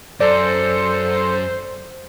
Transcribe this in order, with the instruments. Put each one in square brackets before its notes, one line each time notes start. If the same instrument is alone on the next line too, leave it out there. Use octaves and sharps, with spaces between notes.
[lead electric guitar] F#2 [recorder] A4 [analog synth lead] C5 [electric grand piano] D5